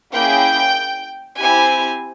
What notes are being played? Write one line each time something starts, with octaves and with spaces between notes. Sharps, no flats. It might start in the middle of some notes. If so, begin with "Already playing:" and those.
A#3 C#4 E4 G#4 G5
C4 E4 G4 G#5